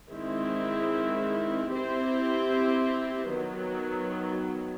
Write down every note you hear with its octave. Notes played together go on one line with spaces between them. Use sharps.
D#3 G#3 C4 E4
C4 E4 G4 C5
D#3 F#3 B3